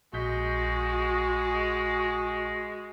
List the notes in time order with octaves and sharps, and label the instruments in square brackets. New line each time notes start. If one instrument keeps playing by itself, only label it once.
[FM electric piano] A#1 G6 B6 [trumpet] G#3 [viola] F#4